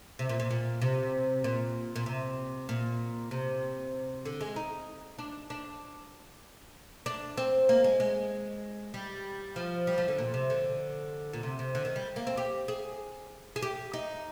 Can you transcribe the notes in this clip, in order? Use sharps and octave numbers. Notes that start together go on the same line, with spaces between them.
C3
A#2
A#2
A#2
C3
A#2
A#2
C3
A#2
C3
D3
G#3
D#4
D4
D4
D4
C4
A#3
G#3
G#3
G3
F3
G3
F3
D3
A#2
C3
D3
A#2
C3
C3
D3
D#3
G3
A#3
C4
G4
G#4
G#4
G4
D#4